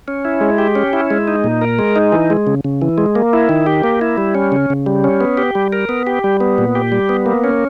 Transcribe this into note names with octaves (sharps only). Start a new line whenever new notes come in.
C#4
E4
G#3
G4
C#4
E4
G#3
D#4
A#2
A#4
G#3
D#4
E3
G#3
C#3
C#3
E3
G#3
A#3
E4
D#3
G4
A#3
E4
G3
C#4
C#3
C#3
G3
C#4
B3
G4
G3
A#4
B3
G4
G3
B3
A#2
G4
G3
B3
A#3
C#4